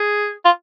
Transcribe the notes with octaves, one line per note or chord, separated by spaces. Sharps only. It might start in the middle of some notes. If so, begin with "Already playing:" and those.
Already playing: G#4
F4